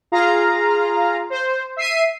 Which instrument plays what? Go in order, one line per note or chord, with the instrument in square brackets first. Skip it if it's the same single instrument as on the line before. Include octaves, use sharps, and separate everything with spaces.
[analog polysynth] F4 G#4 F5 A#5
C5
E5 C7 D#7